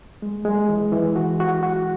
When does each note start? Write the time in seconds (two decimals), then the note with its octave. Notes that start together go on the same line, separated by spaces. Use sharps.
0.22 G#3
0.45 G#3
0.69 E3
0.92 E3
1.16 F#4
1.40 F#4
1.63 F#4